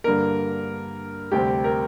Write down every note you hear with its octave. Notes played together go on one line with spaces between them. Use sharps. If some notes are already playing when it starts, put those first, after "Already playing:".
G2 D3 A#3 A#4
D2 C3 G3 C4 G4
A#4